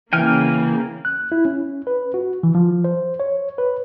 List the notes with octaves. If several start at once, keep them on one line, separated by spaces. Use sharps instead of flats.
C#3 E3 A#3 G5 G#5 F6
F#6
E4
C#4
B4
F#4
E3
F3
C5
C#5
B4